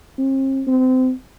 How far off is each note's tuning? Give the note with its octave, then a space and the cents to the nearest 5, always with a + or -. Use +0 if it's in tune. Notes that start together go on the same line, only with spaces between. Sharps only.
C4 +45
C4 -25